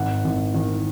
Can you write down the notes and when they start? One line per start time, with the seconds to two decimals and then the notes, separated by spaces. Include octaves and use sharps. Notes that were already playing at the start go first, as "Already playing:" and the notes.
Already playing: G#1 F#5
0.24 G#1
0.54 D#3